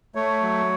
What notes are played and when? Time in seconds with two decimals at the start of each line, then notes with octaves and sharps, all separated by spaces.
0.15 A3 C#5
0.43 F#3